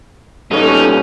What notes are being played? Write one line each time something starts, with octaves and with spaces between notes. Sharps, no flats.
A#2 G3 B3 C#4 D#4 A4